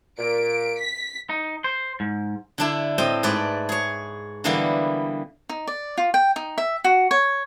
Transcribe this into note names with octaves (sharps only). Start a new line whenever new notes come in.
A#2 D7
B6
D#4
C5
G#2
D3 D4 E4
A2 C4 D#5 G5
G#2 A3 B4 D5
G#4 C#5
D3 E3 G3 A#3 B3 A#4
D#4
D5
F4
G5
D#4
E5
F#4
C#5